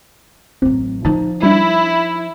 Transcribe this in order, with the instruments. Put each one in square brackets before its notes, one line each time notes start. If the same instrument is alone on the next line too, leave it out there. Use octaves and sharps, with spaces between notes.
[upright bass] A1 F#3 [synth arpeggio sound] C4
[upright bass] F3 D#4 [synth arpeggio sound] A5
[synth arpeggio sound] G3 D4 [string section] E4